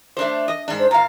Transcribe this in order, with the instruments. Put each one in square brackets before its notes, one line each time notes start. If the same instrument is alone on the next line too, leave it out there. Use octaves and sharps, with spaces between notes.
[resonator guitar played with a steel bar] A3 D4 C5
D#5
G#2 D4
[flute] C5
[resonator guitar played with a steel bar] A#2 F5 [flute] A#5